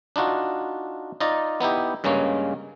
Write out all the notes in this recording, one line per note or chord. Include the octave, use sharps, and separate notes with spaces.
D4 D#4 F4 F#4
D#4 F4 D5 A#5
B3 D#4 E4 G4
G2 C#3 G#3 A#3 C#4